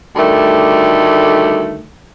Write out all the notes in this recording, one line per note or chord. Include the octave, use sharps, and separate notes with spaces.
D2 D#3 G3 A3